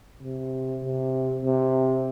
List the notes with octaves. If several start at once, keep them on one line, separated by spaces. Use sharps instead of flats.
C3
C3
C3